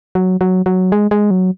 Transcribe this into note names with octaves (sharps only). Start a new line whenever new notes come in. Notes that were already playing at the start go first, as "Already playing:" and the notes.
F#3
F#3
F#3
G#3
G#3
F#3